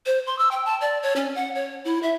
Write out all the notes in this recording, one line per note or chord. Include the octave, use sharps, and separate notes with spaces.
C5
C6
E6
G5
A5
D5
C#5
C#4
F#5
C#5
E4
E5